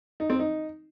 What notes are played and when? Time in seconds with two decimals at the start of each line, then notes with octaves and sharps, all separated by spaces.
0.20 D#4
0.30 C4
0.39 D#4